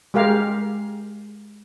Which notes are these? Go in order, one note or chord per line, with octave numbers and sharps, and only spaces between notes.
G#3 G4 A#4 F5